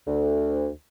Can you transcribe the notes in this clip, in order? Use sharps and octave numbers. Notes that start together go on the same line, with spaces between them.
D2